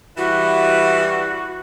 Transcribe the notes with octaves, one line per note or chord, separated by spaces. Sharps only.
E3 G3 F#4